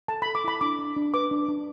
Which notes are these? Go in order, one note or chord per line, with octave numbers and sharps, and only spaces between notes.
A4 A5
A4 B5
D6
E4 B5
D4 D6
D4
D4
B4 D6
D4
D4